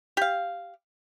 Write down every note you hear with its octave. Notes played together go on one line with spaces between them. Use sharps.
G4 F5